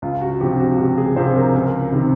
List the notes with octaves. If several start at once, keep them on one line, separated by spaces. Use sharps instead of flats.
C#2 F4
F#4
C3 F3 G4
F#4
C#2 G4
G#4
C3 F3 C5
A#4
C#2
C3 D#3